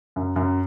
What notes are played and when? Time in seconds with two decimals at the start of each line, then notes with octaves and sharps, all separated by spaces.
0.16 F#2
0.36 F#2